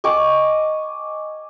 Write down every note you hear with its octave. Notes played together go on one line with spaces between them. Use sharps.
D#5 G#5 C#6 D6